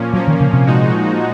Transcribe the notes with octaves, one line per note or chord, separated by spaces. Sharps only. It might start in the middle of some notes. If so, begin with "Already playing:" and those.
Already playing: A#2 F3 A#3 C#4
A#2 F3 F#3 A#3 C#4
D#3
C#3
C3
A#2 F3 G#3 D#4 F#4